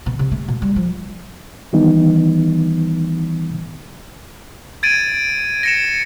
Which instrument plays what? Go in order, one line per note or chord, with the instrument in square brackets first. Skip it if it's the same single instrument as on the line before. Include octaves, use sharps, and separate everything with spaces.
[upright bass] B2
C3
A3
B2
G3
F3
[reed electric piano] D#3 E3 G3 B3 D#4
[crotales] G#6 A6 D7 D#7
A#6 C#7 E7